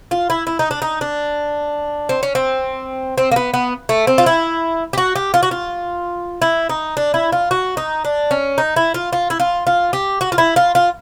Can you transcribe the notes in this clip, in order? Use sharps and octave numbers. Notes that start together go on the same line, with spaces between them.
F4
E4
E4
D#4
D4
D#4
D4
C4
C#4
C4
C4
A#3
B3
B3
A3
C4
F4
E4
G4
F#4
G4
F4
F#4
F4
E4
D#4
D4
E4
F4
F#4
D#4
D4
C#4
D#4
E4
F4
F4
E4
F4
F4
G4
F#4
F4
E4
F4
F4